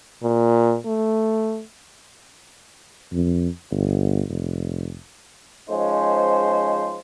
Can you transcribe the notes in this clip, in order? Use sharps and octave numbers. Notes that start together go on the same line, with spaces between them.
A#2
A3
F2
G1
F1
F3 G#3 C#4 D#4 C5